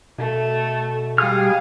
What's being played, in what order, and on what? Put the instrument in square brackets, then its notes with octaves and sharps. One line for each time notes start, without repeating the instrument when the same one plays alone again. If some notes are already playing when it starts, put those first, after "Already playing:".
[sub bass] B2 [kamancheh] A3 A4
[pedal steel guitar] G3 F6 [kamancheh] G#4 F5